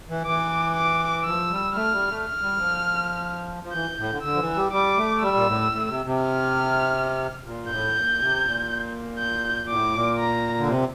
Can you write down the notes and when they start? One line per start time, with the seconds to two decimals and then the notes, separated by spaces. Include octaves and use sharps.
0.09 E3
0.26 E3 D6
0.75 D6
1.25 F3 E6
1.51 G3
1.75 A3 F6
1.92 G3
2.09 A3
2.25 F6
2.41 G3
2.58 F3
3.63 F3
3.73 E3 G6
3.98 A2
4.11 D3
4.23 D3 E6
4.35 F3
4.40 E3
4.56 G3
4.72 G3 D6
4.97 A3
5.22 G3 E6
5.36 A#2
5.47 A2
5.72 A2
5.89 C3
6.06 C3
6.22 F6
7.46 A#2
7.65 G2
7.70 A2 G6
7.95 A#2
8.20 C3
8.45 A#2
9.19 G6
9.69 A2 D6
9.94 A#2
10.19 A#5
10.59 D3
10.67 C3